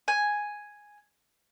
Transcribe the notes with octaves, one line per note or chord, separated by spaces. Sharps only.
G#5